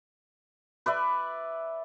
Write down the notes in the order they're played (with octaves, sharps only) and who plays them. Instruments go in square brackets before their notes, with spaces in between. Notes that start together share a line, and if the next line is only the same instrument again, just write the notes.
[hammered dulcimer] B4 D5 E5